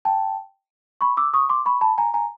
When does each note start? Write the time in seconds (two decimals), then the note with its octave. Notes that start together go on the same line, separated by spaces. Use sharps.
0.05 G5 A5
1.01 B5 C#6
1.17 D6 E6
1.34 C#6 D#6
1.49 C6 D6
1.66 B5 C#6
1.81 A5 B5
1.98 G#5 A#5
2.14 G#5 A#5